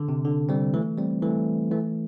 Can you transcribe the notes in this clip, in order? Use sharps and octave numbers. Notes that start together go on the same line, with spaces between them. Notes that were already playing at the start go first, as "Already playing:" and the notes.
Already playing: D3
C3
D3
G3 C4
E3 A3
G3 C4
E3 A3
E3 A3